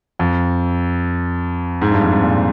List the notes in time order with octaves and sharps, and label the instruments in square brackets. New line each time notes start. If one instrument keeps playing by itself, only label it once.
[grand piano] F2
G#2
G2
F2
G2
A#2